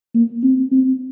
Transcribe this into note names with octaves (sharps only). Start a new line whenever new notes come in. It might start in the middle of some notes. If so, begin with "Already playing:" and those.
A#3
C4
C4